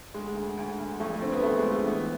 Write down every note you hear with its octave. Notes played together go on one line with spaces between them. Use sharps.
D2 G#3
D2
D2
D2
F2 A3
A3
D3 C4
B3
F2 A3
G#3
D3
A3
E3 B3